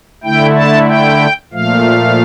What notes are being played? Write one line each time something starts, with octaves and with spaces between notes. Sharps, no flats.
D3 A3 E4 G5
A5
G5
A#2 F3 A3 F5